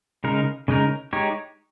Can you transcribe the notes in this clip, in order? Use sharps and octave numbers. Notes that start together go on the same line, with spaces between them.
C#3 G#3 D#4 A#4
C#3 G#3 D#4 A#4
G#3 D#4 G4 C#5